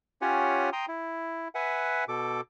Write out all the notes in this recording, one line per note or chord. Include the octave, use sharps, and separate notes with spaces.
C#4 F4 G4 C#5 F#5 G#5
G5 A#5 C6 D#6
E4
B4 E5 F#5 G#5
B2 A4 D6